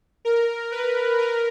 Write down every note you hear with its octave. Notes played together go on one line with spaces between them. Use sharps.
A#4
B4
A#4